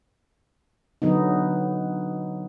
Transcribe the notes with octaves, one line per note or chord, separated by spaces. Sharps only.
D3 F#3 B3 D#4